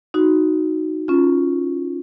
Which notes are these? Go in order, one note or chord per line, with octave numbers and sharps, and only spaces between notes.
D#4 F#4
C#4 F4